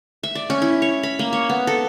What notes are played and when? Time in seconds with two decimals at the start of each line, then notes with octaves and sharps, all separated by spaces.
0.23 E5
0.35 D5
0.50 C#4
0.62 E4
0.82 C#5
1.03 B5
1.19 A#3
1.33 C#5
1.49 B3
1.67 A4